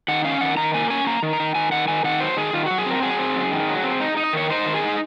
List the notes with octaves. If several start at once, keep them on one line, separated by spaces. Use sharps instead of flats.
D#3 F#5
C#4 F5
D#3 F#5
D#3 A#5
A#3 G#5
C#4 G#5
A#3 A#5
D#3
A#5
D#3
D#3 G#5
D#3 F#5
D#3 G#5
D#3 F#5
F#3 C5
D#3 G#4
D#3 F4
F#3 F#4
G#4
C4 A#4
F#3 G#4
C4
F#2
D#3
F#3
C4
D#4
D#4
D#5
D#3 C#5
D#4 C5
D#3
G#4
D#4